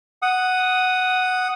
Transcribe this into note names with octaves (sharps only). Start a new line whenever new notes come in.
F#5 D#6